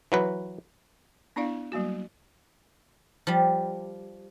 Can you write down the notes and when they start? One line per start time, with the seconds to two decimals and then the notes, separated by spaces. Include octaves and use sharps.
0.12 E3 F#3 B4
1.36 B3 D4 E4 D5 F5
1.72 F#3 G3 A#3 F#4
3.27 F3 G3